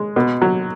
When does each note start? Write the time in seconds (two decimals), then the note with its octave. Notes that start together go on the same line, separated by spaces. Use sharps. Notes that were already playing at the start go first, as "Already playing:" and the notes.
Already playing: G#3
0.16 B2
0.42 F#3